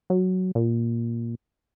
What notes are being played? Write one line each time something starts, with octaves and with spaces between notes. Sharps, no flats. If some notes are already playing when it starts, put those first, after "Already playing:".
F#3
A#2